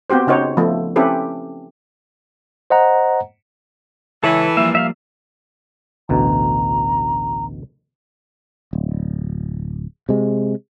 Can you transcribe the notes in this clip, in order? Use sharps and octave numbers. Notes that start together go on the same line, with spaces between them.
B3 C4 F#4 G4 C5
C#3 D#4 F#4 C5 C#5
F3 A3 B3
C4 C#4 E4 G4 A4 B4
C5 D#5 F#5 A#5
C#2 E3 A4 C#5 B5
F3 G3 A#3 E5
E5 F5 F6
A1 D2 B2 A#5
D1
C3 G#3